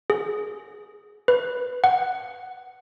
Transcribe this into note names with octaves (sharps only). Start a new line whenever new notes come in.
G#4
B4
F#5